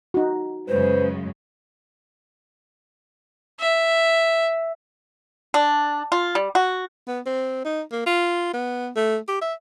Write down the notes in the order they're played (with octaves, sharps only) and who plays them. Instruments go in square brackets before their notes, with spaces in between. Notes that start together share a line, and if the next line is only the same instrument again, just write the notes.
[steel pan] D#4 F#4
[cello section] F#2 C#3 G#3 [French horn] B4 [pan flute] C5
[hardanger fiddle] E5
[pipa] D4
F4
G3
F#4
[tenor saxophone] B3
C4
D#4
A#3
F4
B3
A3
G4
E5